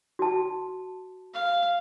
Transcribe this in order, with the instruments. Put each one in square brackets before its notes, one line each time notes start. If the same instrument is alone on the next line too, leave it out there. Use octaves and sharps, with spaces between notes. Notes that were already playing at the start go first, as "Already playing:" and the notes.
[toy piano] F#4 A5
[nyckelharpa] F5